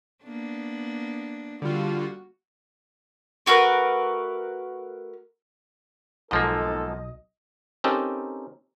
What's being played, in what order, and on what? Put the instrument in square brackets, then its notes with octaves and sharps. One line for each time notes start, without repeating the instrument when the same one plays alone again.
[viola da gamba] A#3 B3 D4
[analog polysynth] D3 G3 F4 [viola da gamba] F#4
[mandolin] A3 F#4 A#4 B4
[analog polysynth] B1 D#5 [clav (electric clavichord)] G#2 F3 A#3 [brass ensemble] A4
[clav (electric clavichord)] C4 C#4 D#4 G4 A4 A#4